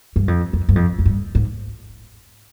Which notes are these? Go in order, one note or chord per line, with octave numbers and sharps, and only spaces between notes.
G2
F2
F2
G2
F2
F2
G2
G#2